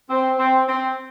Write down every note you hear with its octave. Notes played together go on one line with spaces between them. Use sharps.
C4
C4
C4